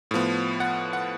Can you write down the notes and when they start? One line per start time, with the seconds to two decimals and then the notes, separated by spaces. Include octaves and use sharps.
0.11 A2 F3 B3
0.60 F#5
0.93 F#5